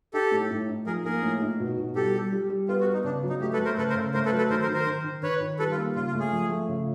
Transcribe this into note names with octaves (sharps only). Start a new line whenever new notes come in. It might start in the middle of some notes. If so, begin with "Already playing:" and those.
D#4 G4 A4
A2
A2
D#4
F3 G#4 A#4
A#3 G#4 A#4
A2
D#4
B2
B2
G3 G4 A4
G3
G3
G3
B3 F4
F#4
B3
D#4
C#3 D4
F#3
D#4
A3 G4
A4 B4
A3
A#4 C5
C#3 A4 B4
A#4 C5
C#3
A3 A#4 C5
A4 B4
F#3
A4 B4
D#3 A#4 C5
A#4 C5
D#3
A#4 C5
D#3
D#3
D#3 B4 C#5
D#3
G3 A4 B4
F4
A#3
C#3 F4
F4
A3
G#4
F3
A3
C#3